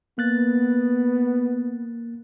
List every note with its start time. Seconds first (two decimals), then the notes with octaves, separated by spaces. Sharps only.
0.18 A#3 B3 F#6 A6